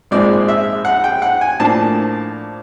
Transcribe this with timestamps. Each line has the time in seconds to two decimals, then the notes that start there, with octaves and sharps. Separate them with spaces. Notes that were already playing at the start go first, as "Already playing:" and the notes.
0.11 A#1 G#2 F3 G#3 C4 D5
0.48 E5
0.85 F#5
1.04 G5
1.22 F#5
1.41 G#5
1.60 A2 F3 A#3 D4 A5